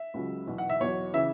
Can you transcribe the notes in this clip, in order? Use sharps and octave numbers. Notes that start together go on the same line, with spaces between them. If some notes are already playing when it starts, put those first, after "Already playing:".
Already playing: E5
C#2 C#3 F#3
E2 B2 F#3
F#5
E5
E2 B2 F#3 C#5
C#3 E3 E5